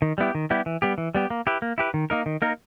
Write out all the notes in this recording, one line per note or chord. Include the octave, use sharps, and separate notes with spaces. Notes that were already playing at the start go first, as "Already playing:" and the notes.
D#3
G3 B3 E4 G4
D#3
G3 B3 E4 G4
E3
G3 B3 G4
E3
G3 B3 G4
A#3
E4 G4 B4
A#3
E4 G4 B4
D#3
A#3 D#4 A#4
D#3
A#3 D#4 A#4